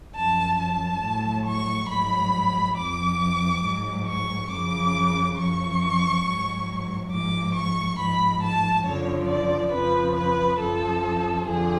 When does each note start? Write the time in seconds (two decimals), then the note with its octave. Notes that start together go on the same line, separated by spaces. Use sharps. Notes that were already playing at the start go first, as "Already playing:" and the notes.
0.14 F#2 F3 A5
0.58 A5
1.02 A2 F#3
1.45 C#6
1.89 G#2 F#3 B5
2.76 F2 F3 D6
3.63 G#2 F#3
4.06 C#6
4.50 F#2 C#3 F3 D6
5.37 F#2 F3 C#6
6.24 G#2 F#3
7.11 G#2 F3 D6
7.55 C#6
7.98 G#2 F3 B5
8.42 A5
8.85 F#2 D3 F3 C#5
9.28 D5
9.72 F2 C#3 F3 B4
10.15 B4
10.59 F#2 F3 A4
11.46 F2 D3 F3 G#4